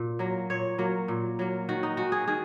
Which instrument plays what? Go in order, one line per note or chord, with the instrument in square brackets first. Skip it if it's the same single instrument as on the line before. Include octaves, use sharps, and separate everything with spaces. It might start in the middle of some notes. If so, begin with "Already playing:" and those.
Already playing: [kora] A#2
F#3 A#3
A#2 C#5
F#3 A#3
A#2
F#3 A#3
D#3 F#4
D#4
G#3 F#4
G#4
D#3 G#4